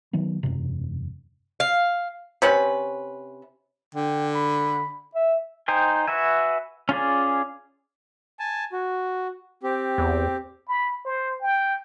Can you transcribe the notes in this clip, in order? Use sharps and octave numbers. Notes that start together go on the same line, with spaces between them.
D#3 F#3 B3
E1 F#2 C3
F5
C3 C#4 B4
D3 G5
B5
E5
D#4 C5 G5 G#5
F#4 B4 E5 G#5
C#4 F4 G#4 D5
G#5 A5
F#4
C4 G4
E2
B5
C5
G5